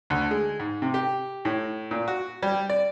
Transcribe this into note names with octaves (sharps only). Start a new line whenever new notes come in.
D2
G#3
G#2
C3
G4
A2
A#2
F#4
G3
D5